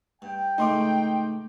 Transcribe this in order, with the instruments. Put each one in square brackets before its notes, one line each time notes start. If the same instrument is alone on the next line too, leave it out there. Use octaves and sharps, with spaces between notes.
[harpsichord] G2 [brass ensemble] G5
[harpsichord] C#2 A2 A3 [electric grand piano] D#4 C6 D6